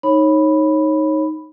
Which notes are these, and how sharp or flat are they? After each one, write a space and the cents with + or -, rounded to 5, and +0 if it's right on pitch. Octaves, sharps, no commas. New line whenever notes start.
D#4 +0 C#5 -20 B5 +0